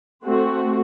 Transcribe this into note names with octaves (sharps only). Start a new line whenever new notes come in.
A3 C4 F#4